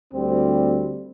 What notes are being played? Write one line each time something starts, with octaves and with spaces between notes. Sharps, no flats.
D2 G3 C4